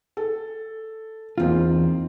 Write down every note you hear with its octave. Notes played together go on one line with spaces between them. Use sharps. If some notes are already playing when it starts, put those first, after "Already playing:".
A4
E2 A#3 C4 D#4 F4